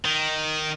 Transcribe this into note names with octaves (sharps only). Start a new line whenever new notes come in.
D#3